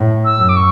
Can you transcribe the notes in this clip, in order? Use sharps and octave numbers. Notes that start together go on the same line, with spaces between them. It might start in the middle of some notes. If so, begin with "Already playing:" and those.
Already playing: A2
E6
F#2
D6
C#6